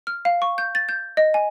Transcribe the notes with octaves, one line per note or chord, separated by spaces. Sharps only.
F6
F5
C#6
G6
A6
G6
D#5
G#5